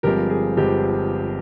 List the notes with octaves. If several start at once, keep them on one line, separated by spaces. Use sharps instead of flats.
G1 G2 F3 G#3 C4 G4 A#4
G#4
G1 G2 F3 G#3 C4 G4